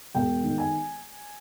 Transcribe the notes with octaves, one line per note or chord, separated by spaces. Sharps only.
E1 G5
D#3
G#5